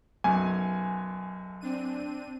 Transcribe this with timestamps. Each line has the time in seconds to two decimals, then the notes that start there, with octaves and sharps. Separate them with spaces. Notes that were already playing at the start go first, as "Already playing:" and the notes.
0.24 B1 F#2 G#5
1.61 C4 D4 D#7